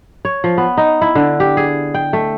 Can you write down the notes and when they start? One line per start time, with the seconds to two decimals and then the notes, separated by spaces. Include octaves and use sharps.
0.25 C#5
0.44 F3
0.58 B3
0.77 D#4
1.01 E4
1.15 D3
1.40 G4
1.57 G#4
1.94 G5
2.13 A3